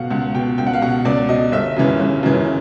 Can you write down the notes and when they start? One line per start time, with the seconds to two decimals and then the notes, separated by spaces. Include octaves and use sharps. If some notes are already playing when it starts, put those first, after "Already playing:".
Already playing: C#2 B2 F5 F#5
0.10 C#2 F#5
0.34 B2 G5
0.58 C#2 G5
0.67 F#5
0.73 F5
0.82 B2 F#5
1.05 C#2 D5
1.29 B2 D#5
1.52 G1 E5
1.77 F#2 C#3 E3
2.00 G1
2.23 F#2 C#3 E3